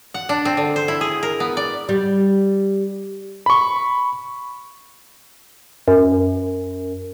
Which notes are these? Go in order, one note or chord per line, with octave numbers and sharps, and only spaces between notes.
F#5
D4
C4
D3
C5
E4
G#4
A#4
B3
D5
G3
B5 C#6
F#2